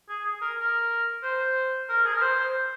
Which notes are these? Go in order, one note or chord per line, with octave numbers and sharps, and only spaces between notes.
G#4
G#4
A#4
A#4
C5
A#4
G#4
A#4
C5